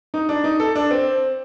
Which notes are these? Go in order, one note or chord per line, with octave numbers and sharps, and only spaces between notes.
D#4
D4
D#4
A4
D4
C4